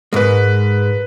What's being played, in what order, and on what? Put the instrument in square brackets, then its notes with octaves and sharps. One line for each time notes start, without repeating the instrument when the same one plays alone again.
[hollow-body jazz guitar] G#2 G#3 [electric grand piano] A#4 B4